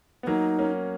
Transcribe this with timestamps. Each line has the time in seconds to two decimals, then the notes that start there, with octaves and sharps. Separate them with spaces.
0.23 B3
0.27 F#3 A#3 D#4
0.58 A#3 C#4